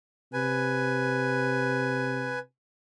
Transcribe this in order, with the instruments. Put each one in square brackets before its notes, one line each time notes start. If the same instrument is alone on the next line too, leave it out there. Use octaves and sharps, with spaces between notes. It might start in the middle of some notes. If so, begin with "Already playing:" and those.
[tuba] C3 [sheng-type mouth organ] B4 G#5